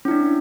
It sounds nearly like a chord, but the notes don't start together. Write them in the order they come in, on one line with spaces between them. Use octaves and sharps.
C#4 E4 D4